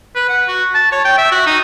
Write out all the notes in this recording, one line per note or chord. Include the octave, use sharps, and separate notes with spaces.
B4
F#5
F#4
A5
C#5
G5
E5
F#4
D#4